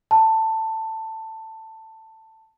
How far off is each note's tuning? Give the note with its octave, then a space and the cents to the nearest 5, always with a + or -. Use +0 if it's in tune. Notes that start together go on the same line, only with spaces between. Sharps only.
A5 +15